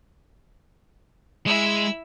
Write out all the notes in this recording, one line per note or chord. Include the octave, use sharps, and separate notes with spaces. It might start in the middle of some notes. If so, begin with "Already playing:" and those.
G#3 E4 E6